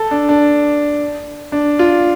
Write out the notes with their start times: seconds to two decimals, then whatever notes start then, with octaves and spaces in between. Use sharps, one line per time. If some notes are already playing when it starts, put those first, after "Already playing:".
Already playing: A4
0.11 D4
0.29 D4
1.52 D4
1.79 F4